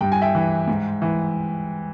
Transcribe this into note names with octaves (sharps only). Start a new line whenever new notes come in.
G2 G5
G#5
E5 G5
E3
G#2
E3